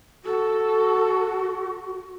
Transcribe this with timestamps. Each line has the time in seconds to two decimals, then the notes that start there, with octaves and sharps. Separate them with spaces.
0.24 F#4 A4